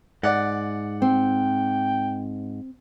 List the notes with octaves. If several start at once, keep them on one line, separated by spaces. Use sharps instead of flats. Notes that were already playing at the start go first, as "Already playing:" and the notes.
G#2 D5 F#5
C4 G5